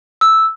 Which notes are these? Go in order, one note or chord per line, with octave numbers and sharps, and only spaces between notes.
E6